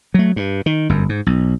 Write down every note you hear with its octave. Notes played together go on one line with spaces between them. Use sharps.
F#3 A3
G2
D#3
G1 F#2
G#2
B1